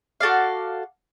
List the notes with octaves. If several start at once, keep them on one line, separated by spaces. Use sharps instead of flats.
F#4 A4 D5 F5